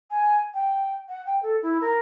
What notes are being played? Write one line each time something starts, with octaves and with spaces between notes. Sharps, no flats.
G#5
G5
F#5
G5
A4
E4
A#4